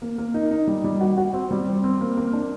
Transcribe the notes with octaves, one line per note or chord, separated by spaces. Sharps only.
A#3
A#3
D#4
D#4
G3
G3
F#4
F#4
C4
G3
C4
C4
A#3
A#3
D4